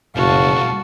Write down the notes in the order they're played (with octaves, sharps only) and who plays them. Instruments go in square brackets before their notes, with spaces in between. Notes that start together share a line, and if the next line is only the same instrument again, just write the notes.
[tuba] F#1 [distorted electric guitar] B1 A#2 [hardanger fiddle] F#4 [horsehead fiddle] F5 A5